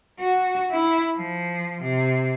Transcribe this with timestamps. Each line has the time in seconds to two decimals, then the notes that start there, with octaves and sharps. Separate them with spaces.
0.19 F#4
0.71 E4
1.16 F3
1.81 C3